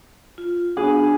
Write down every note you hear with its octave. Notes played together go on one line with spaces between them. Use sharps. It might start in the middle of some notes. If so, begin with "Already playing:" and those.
F4
B3 D4 F#4 G#4